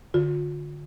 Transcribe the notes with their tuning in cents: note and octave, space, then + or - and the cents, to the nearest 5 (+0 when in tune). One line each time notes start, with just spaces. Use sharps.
D3 +0 F4 +40